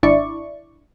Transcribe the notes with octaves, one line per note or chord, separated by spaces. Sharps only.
G#1 D4 E4 D5 C#6